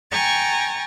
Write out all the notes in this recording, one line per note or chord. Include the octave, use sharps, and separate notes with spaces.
G5 G#5 A#5 C#6 A6